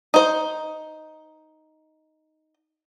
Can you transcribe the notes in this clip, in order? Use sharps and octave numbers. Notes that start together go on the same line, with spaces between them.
D#4 C5